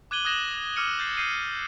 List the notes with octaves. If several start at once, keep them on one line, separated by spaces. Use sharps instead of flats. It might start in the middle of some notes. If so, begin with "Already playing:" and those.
D6 F#6 G#6 D#7 F#7 G7
D#6 F#6 G#6 A#6 E7 F#7
D6 E6 F6 C#7 D#7 G7
G6 A6 C7
E6 G6 C7 D#7